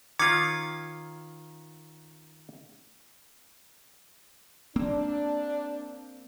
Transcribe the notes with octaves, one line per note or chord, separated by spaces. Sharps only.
D#3 C#4 F4 D6 G#6 C#7
A#3 C4 D4